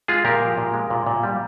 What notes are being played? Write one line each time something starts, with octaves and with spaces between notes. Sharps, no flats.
G#3 F4 G#4
A#2 G4 A#4
F3
A#2
G#3
A#2
A#2
G3